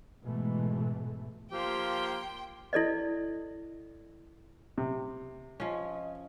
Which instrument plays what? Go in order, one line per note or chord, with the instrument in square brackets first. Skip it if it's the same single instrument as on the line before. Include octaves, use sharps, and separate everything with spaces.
[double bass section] G#2 B2 E3 G#3 A3
[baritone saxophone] F3 [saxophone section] A#3 G4 [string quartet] G5 C6
[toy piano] E4 A4 D5 D#5
[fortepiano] C3
[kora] F3 C#4 [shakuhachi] D#5